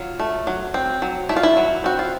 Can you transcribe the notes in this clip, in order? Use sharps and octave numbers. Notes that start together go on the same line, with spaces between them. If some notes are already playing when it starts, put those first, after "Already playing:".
Already playing: F#3 F4
A3
F#3
C4
F#3
A3 E4
F4
E4
F#3
C4 F#4
F4